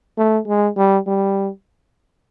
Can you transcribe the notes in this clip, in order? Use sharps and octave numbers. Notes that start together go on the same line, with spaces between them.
A3
G#3
G3
G3